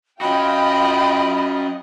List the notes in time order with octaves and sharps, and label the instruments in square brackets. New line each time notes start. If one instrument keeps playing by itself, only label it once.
[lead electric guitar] C#4 F#4 [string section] F4 G5 [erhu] D#5 [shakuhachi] B5